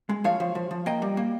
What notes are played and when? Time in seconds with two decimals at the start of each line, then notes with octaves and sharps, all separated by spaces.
0.09 G#3
0.24 F3 C#5 F5
0.40 F3
0.55 F3
0.71 F3
0.86 A#3 D#5 G5
1.02 G3
1.17 A#3